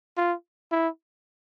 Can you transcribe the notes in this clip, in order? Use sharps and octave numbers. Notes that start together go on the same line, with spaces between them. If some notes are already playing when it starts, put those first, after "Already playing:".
F4
E4